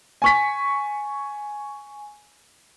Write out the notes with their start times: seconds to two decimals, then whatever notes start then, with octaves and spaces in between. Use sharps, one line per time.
0.22 G#5 C#6 B6